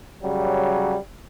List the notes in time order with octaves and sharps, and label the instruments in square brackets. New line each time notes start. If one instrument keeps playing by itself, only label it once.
[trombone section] C#3 F#3 G3